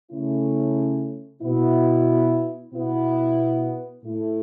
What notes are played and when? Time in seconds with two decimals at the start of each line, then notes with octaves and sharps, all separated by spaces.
0.11 C#3 A3 C#4 E4
1.42 B2 B3 E4
2.72 B2 B3 E4
4.03 A2 A3 E4